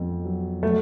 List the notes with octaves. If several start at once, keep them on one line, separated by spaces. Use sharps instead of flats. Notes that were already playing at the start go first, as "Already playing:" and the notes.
Already playing: F2 B3
F#3
F#3 A3